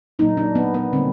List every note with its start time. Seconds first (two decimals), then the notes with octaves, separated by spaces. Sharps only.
0.19 A#2 F#3 A#3 D#4
0.37 D4
0.55 B3
0.74 B3
0.93 D3 G3 A#3 C4